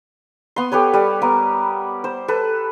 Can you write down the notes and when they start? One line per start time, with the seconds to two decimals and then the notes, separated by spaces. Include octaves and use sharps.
0.56 B3 C6
0.72 G4 A4 B4 C#5
0.94 G3
1.22 B3 A#4
2.04 C5
2.28 A4 B4